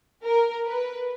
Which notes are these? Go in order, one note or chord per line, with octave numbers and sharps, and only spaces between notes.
A#4
B4